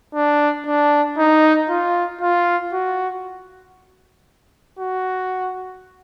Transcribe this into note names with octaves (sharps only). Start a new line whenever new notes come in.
D4
D4
D#4
F4
F4
F#4
F#4